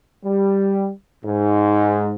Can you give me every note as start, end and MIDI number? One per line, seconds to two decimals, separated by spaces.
0.25 0.89 55
1.26 2.15 44